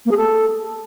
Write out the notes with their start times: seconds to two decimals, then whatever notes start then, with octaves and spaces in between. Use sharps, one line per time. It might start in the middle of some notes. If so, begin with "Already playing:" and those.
0.06 A#3
0.11 G#4
0.17 A4